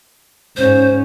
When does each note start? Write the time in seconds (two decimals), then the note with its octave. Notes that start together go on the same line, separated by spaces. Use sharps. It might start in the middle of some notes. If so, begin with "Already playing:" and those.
0.57 G#2 C#4 C5